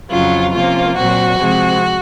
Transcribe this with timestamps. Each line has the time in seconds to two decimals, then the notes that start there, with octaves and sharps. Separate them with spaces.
0.10 F2 C#3 F#3 F4
0.53 C3 F3 A#3 C#4 F4
0.96 A#2 F#3 C4 F#4
1.39 C3 F3 G#3 C4